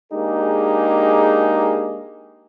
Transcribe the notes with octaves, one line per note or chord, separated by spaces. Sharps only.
G#3 A#3 D4 D#4 G4 G#4